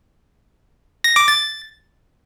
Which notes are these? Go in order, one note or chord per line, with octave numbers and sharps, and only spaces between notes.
A#6
D6
A6